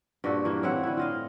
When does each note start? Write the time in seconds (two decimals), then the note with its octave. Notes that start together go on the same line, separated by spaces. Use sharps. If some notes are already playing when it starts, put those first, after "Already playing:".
0.24 G2 A#2 F#4 A4
0.45 E3 A#3
0.63 A2 C4 E4 F#5
0.83 D3 E4
0.97 F4 D#5 F5